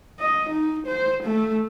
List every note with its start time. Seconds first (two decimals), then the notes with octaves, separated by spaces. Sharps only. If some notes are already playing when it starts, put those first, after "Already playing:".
0.20 D#5
0.49 D#4
0.87 C5
1.23 A3